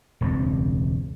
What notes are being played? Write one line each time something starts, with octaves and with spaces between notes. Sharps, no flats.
E1 C#2 G2 C4